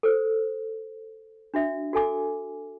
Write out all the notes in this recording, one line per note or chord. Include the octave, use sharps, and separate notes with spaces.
A4 C5
D4 F#4 E5
F#4 A4 G#5 D6